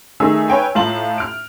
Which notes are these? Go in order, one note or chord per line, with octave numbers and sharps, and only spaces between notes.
D#3 A3 D#4 G#4 E5 E6
B4 C#5 G5 G#5
A2 F4 F5 A5 A#5 F#7
F6 D7